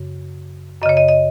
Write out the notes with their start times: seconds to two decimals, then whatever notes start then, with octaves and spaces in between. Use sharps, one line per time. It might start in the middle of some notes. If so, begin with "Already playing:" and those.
Already playing: F#2 C#3
0.82 F#2 D#5
0.86 C#3 C#5
0.97 D#5
1.08 D#5